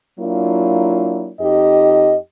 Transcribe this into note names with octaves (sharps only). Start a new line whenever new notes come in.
F#3 A#3 D4 E4 F4
F2 D#4 G4 D#5